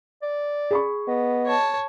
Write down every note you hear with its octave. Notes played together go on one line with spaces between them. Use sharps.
D5
G#4 B5 C#6
B3 D#5
C#5 A5